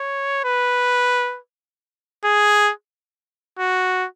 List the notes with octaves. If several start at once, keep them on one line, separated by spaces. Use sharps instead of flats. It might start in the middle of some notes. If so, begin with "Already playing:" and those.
Already playing: C#5
B4
G#4
F#4